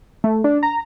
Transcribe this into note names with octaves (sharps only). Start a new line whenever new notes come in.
A3
D4
A#5